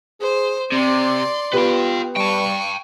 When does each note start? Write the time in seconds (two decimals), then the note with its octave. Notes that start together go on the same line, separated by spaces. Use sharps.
0.21 G#4 C5
0.72 C3 C4 D5 C6
1.53 B3 F4 G4 B4 G5
2.16 G3 G5 A5 C#6